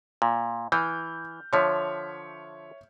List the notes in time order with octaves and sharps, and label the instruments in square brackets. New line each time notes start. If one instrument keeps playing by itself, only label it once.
[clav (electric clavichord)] A#2
[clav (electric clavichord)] E3 [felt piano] F6 G6
[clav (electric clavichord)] D3 F3 [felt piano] C#5 E5 B6